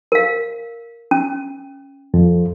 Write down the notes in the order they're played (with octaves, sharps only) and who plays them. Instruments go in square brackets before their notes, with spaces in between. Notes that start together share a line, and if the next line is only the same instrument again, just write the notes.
[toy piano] A#4 F5
C#4
[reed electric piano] F2